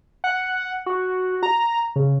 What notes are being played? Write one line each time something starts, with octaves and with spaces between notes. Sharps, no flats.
F#5
F#4
A#5
C#3